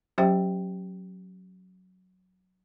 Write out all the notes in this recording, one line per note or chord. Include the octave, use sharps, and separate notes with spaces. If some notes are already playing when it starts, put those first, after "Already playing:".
F#3 C#4 G4 C5 E5 G5